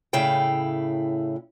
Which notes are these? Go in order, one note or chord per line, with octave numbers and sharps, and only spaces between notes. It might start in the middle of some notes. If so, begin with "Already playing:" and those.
A2 C#3 E4 F5 G5